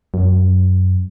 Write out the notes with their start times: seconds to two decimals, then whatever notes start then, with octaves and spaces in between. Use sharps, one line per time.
0.14 F#2